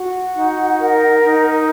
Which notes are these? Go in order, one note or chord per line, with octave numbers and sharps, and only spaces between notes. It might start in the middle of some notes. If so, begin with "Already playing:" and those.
Already playing: F#4 F#5
D#4
A#4
D#4